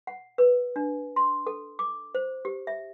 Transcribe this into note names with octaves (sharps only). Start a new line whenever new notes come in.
F#5
B4
D4
C6
A4
D6
C5
G4
E5